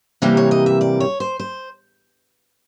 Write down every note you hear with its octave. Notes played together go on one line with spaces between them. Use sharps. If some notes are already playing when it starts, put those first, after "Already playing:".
C3 E3 G3 A#3 G4
C#5
D#5
E5
D5
C#5
C5
C5